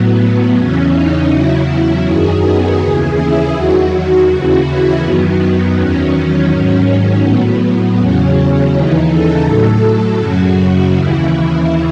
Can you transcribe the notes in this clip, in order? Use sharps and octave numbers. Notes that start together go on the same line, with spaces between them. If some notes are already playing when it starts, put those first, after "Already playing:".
Already playing: A2 F#3 B3
E2 C#3 E3 C#4
D#4
E2 C#3 F#3 E4
E4
F#2 D#3 F#3 G#4
B3
D#2 C#3 E3 G#4
E4
E2 D#3 F#3 F#4
D#2 C#3 E3
E4
F#2 D#3 F#3 B3
B3
E2 D#3 F#3 C#4
G#2 D#3 F#3 C#4
A2 F#3 B3
E2 C#3 F#3 C#4
D#2 C#3 E3 D#4
A4
A2 F#3 A4
F#2 C#3 F#3 F#4
D#2 C#3 E3 E4